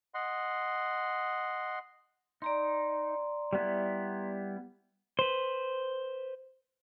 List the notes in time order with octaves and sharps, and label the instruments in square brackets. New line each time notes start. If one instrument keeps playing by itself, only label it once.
[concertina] D#5 F#5 C6
[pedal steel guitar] D#4 [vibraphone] D5 A#5 C6
[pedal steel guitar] G3 B3 E4
[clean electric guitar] B4 C5